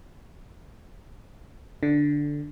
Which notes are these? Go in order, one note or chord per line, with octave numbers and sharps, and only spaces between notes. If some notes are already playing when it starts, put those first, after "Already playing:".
D3